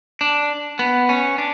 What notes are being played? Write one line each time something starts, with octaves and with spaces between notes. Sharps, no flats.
D4
B3
C#4
D4